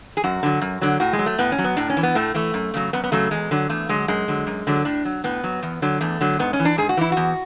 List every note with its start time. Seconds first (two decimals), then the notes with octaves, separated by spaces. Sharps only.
0.17 G#4
0.24 F#2 F#4
0.43 D3 F#3
0.61 F#2
0.81 D3 F#3
1.00 A2 F#4
1.13 G#3
1.19 F#3
1.26 A3
1.38 A2 B3
1.52 C#4
1.58 F#3
1.64 B3
1.77 A2 D4
1.90 C#4
1.97 E3
2.03 B3
2.15 A2 A3
2.34 E3 A3
2.54 F#2
2.74 C#3 F#3
2.93 F#2 B3
3.04 B3
3.12 C#3 F#3 A3
3.31 E2 G#3
3.51 D3 F#3
3.70 E2 A3
3.89 D3 F#3 G#3
4.08 F#2 G#3
4.28 D3 F#3
4.47 F#2
4.67 D3 F#3
4.85 A2 D4
5.05 F#3
5.24 A2 B3
5.44 F#3
5.63 E2
5.82 D3 F#3
6.01 E2 A3
6.21 D3 F#3
6.39 G#2 B3
6.53 C#4
6.59 E3
6.65 D4
6.78 G#2 G#4
6.89 F#4
6.97 E3 E4
7.12 E2 F#4